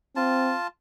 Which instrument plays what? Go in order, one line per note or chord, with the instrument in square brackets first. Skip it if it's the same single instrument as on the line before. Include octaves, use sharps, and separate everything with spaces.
[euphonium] C4 [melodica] F4 A5